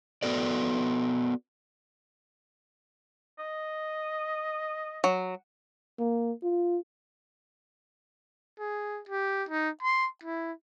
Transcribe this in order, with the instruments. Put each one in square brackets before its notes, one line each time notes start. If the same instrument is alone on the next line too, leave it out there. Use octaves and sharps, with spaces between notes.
[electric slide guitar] B3 F#4 A4 D5
[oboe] D#5
[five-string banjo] F#3
[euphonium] A#3
F4
[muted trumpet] G#4
G4
D#4
C6
E4